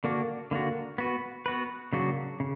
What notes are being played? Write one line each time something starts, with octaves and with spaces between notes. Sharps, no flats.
D3 A#3 D4 F#4
D3 A#3 D4 F#4
B3 F#4 B4
B3 F#4 B4
C#3 F#3 A#3 D4 F#4
C#3